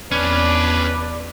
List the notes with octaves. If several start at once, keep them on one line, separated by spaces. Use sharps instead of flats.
E2 C#4 D4 B4 D5